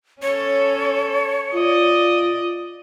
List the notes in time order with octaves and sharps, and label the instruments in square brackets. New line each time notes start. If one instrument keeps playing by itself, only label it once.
[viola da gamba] C#4 A4 [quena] C#5
[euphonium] F4 [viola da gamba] D5 D#5